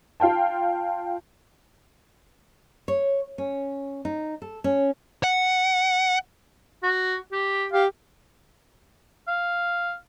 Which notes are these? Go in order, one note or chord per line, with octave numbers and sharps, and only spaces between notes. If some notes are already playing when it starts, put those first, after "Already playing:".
F4 F5 G5 A5
C#5
C#4
D#4
A4
C#4
F#5
F#4
G4
G4 F5
F5